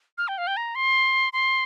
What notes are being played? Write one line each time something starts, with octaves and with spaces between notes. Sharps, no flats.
F6
G5
F5
G5
A#5
C6
C6